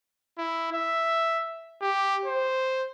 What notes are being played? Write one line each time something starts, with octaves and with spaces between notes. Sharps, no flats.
E4
E5
G4
C5